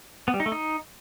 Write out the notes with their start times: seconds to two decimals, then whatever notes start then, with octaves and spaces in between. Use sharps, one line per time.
0.28 B3
0.34 G3
0.40 D#4
0.46 A3
0.52 D#4